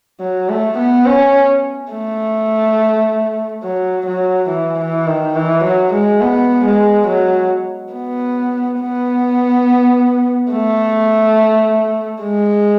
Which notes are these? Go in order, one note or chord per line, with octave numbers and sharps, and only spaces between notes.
F#3
A3
B3
C#4
A3
F#3
F#3
E3
E3
D#3
E3
F#3
G#3
B3
G#3
F#3
B3
B3
A3
G#3